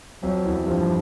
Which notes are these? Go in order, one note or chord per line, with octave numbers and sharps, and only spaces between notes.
F2 F3 F#3
E2 E3
G2 F3 G3